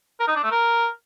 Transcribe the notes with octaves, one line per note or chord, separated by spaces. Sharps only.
A#4
D#4
D4
A3
A#4